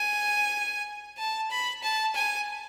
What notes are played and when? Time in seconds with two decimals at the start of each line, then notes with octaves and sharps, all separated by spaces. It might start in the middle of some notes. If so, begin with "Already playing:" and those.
Already playing: G#5
1.18 A5
1.50 B5
1.82 A5
2.15 G#5